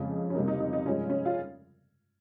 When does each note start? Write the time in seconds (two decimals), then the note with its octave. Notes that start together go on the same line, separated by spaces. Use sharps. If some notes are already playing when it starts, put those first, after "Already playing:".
Already playing: F2 C#3 F3 G#3 C#4
0.30 C#4
0.35 C3 G3 A#3 D#4
0.48 D#4
0.60 D#4
0.73 D#4
0.85 G2 F3 G#3 C#4
1.10 C#4
1.25 F4